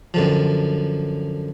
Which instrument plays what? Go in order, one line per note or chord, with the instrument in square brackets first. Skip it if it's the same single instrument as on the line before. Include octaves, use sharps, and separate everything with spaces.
[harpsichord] F#2 D3 F3